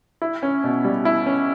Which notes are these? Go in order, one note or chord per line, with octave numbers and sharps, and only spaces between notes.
E4
C#4
B2
G3
E4
C#4